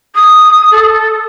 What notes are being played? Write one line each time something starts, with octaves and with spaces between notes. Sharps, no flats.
D#6
A4